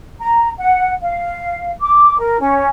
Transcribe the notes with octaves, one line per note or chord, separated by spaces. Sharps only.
A#5
F#5
F5
D6
A#4
C#4